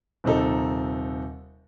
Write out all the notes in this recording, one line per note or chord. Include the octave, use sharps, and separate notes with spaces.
D#1 C3 C4 D#4 A4